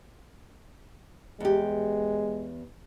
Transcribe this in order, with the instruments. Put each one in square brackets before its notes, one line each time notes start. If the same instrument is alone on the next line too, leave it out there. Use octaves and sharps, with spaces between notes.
[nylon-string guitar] E2 G4 [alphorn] G#3